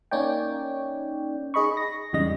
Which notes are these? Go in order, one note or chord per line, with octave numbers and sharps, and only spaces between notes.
A#3 C#4 D#4 C#5 D5 G5
D#4 G#4 D#5 B5 C#6
A#6
E2 G#2 C#3 G3 D#5 A#6